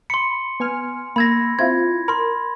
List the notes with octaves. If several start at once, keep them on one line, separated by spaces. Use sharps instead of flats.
B5 C6 C#7
B3 G#5 F6
A#3 B5 E6 G#6 A#6
C4 E4 F4 G#6
A#4 B5 C6